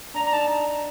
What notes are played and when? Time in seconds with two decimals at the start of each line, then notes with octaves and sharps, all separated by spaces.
0.14 D4 A#5
0.24 A#5
0.32 D#4 A5